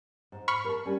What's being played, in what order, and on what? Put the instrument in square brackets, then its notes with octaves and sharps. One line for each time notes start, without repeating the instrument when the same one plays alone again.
[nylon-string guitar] G#2
[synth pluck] B5 C#6 F6
[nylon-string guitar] A#4 A5
G3 C#4